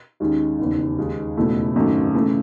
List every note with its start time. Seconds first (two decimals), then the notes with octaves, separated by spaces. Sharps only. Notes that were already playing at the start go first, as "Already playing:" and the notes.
0.20 D#2 D#3 G#3 C#4
0.58 F#1 E2 D#3
0.98 D#2 D#3 G#3
1.37 F#1 E2 B2 A3 E4
1.75 G#1 F#2 D#3 A3 D#4
2.15 C#3 E3 A3